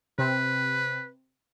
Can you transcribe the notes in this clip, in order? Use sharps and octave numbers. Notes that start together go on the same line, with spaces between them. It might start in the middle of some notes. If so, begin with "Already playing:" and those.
C3 C4 B4